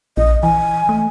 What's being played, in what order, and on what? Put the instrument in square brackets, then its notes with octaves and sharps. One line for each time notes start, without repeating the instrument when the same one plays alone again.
[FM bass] A#1 [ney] D#5
[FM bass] E3 [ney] G#5
[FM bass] A3